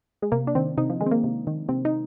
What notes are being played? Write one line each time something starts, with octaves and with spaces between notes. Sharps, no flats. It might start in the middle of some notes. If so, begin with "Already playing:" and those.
G#3
C3 A#3
D4
D#3 C4
C3 D#4
F3
D#3 G#3
C4
A#3
C3
D#3
C3 C4
D#4